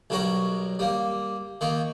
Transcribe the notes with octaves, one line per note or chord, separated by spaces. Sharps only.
B1 G3 F#4 A#4 C#5 A#5
G3 A#3
D#3 A#3 C#6